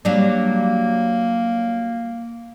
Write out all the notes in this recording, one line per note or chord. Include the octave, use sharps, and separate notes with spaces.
F#3 G3 A#3 D4